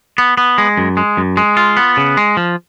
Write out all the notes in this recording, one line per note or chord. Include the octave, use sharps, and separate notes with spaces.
B3
B3
G#3
F#2
G#3
F#2
G#3
F4
B3
C#3
G#3
F3